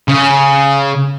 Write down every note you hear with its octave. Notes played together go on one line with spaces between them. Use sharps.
C#3